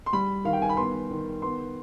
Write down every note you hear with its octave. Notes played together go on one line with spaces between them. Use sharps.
C6
G3 B5
D#3 F5
G5
G#5
B5
B3 C6
D#3
B3 C6